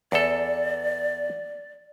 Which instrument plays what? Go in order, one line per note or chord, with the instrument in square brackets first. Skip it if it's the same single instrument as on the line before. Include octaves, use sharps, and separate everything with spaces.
[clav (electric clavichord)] E2 A4 [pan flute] D5